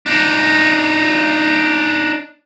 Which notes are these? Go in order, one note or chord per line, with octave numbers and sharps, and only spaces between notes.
D4 D#4